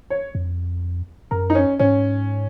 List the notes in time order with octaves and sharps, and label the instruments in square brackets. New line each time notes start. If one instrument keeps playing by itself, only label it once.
[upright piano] C#5
[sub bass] F2
[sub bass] F#2 [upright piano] A#4
[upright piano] D#4
C#4
[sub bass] G#2 [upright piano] C#4